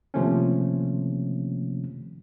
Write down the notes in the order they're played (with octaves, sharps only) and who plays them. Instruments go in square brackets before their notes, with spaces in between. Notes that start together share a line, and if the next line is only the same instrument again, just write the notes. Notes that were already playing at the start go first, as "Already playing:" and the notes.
[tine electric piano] C3 D#3 F3 A3 A#3 C#4